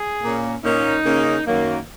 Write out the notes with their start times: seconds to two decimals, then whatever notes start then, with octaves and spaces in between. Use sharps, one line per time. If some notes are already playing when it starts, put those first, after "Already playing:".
Already playing: G#4
0.23 A#2 A#3 C#4
0.64 A#2 A#3 C#4 D#4
1.05 C#3 A#3 C#4
1.46 F#2 D#3 F#3 A#3